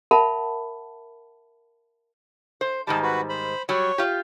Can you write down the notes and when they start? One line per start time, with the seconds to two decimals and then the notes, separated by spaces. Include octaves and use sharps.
0.11 A#4 E5 F#5 A5 B5
2.61 C5
2.87 G#2 D#3 G3 A5
3.03 F#4 B4
3.29 C5 B5
3.69 F#3 G3 C#5
3.98 F4 G4